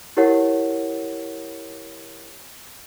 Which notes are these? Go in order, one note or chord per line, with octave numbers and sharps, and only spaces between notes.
E4 G4 A#4 C#5 F#5